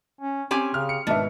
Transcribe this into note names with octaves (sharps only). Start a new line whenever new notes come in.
C#4
C4 C#4 G4 G#5
C#3 F6
C#7
G#1 B2 D4 B4 E5